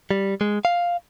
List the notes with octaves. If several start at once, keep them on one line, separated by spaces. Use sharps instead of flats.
G3
G#3
F5